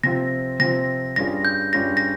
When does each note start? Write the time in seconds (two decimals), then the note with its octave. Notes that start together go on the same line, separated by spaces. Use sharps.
0.04 C3 F3 C4 F4 A#6
0.60 C3 F3 C4 F4 A#6
1.16 G2 G3 C#4 F4 G#4 A#6
1.45 G6
1.73 G2 G3 C#4 F4 G#4 A#6
1.97 A#6